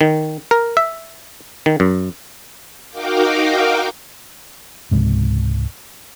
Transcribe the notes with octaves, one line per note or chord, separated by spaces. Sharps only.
D#3
A#4
E5
D#3
F#2
D#4 F#4 A#4 F5 G5 D6
C#2 G#2 C3